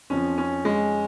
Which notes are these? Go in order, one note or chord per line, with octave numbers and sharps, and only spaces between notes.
F2 F3 C#4
C#4
G#3